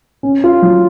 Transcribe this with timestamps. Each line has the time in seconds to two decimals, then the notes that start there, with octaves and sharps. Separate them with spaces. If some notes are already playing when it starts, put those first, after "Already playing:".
0.23 C#4
0.44 F4
0.62 F#3